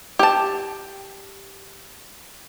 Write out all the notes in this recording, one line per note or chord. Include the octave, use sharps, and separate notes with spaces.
G4 A5